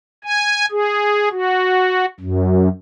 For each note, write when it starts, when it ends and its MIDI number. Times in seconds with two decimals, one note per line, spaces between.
0.24 0.66 80
0.71 1.29 68
1.32 2.06 66
2.20 2.69 42